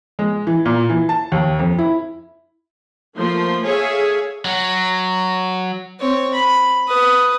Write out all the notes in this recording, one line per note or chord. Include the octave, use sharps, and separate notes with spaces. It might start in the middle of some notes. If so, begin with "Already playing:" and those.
G#3
E3
A#2
E3
A5
D#2
F2
E4
F3 A3 A#3 C6
G#4 A4 C#5 E5 F5
F#3
C4 C#5
B5
B4 D#6